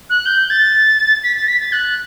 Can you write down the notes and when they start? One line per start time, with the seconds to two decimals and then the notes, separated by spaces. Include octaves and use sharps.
0.10 F#6
0.26 G6
0.50 A6
1.23 B6
1.36 A6
1.48 B6
1.60 A6
1.72 F#6